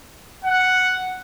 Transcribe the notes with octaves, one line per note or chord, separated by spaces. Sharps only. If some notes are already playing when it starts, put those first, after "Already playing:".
F#5